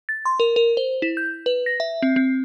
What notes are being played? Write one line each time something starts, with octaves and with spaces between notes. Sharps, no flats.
A6
C6
A#4
A#4
C5
E4
G6
B4
A#6
E5
C4
C4